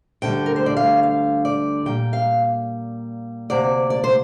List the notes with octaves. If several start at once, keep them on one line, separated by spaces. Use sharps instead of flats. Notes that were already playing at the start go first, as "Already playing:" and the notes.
D2 D3 G3 G5
A#4
C5
D5
F5
F5
D5
A#2 G3 A#3 G5
F5
D2 C3 A#3 D5
D5
C5